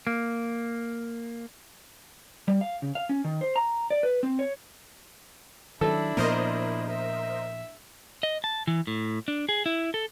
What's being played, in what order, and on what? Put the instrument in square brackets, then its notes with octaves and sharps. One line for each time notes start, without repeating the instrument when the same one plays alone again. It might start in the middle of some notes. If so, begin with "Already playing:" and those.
[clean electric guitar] A#3
[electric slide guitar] G3
F5
C#3
F5
C#4
D#3
C5
A#5
D5
B4
C4
C#5
[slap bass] D#3 E3 F#3 [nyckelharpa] D4 E4 [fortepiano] A4
[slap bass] A#2 F3 B3 [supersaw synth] A#4 C5 D#5
[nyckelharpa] E5
[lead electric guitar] D#5
A5
E3
A2
D4
G#4
E4
A4